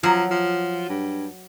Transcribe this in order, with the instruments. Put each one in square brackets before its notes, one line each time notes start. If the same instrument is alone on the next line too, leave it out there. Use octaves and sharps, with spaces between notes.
[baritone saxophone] F3 [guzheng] F#3
[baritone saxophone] F3
G2